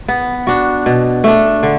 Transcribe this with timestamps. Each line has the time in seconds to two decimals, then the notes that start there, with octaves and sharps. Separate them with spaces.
0.08 B3
0.47 D4 F#4
0.86 B2
1.24 A3 D4
1.63 D3